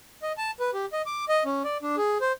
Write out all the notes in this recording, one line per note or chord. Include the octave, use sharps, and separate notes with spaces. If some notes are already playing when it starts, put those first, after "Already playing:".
D#5
A5
B4
G4
D#5
D6
D#5
C#4
D5
D4
G#4
C5